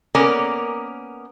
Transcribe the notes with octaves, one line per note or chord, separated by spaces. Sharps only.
A#3 B3 C#4 A#4 D5